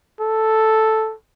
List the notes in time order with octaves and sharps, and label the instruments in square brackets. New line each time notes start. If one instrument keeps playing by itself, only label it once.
[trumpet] A4